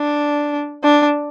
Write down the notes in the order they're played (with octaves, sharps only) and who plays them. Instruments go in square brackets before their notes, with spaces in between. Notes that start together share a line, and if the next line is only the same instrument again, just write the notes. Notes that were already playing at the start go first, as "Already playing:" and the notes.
Already playing: [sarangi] D4
D4